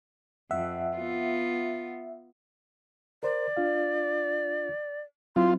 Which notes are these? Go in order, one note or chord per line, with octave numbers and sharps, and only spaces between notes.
F2 E5 F#5
B3 F4
A#4 C5 D5
D4 F4 F5
F#3 C4 E4 F4 C6